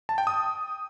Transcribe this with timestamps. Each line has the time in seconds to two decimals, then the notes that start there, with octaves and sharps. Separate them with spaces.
0.09 A5
0.18 G5
0.27 D#6